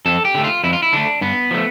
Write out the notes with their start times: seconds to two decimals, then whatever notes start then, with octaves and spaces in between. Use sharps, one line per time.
0.06 F2 A4
0.25 G4
0.34 D3 A3
0.44 F4
0.64 F2 E4
0.73 F4
0.83 E4
0.93 D3 A3 D4
1.21 G2 B3
1.51 F3 A3